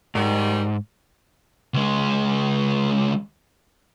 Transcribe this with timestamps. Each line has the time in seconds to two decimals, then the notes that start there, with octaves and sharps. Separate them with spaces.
0.15 G#2 D#3 G3
1.74 C#2 G#3